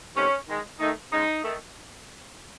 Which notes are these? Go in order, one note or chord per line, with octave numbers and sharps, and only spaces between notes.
C3 D#3 A3 C#4
D#3 G#3
D#3 A3 D#4
C#3 G#3 D#4
D#3 A3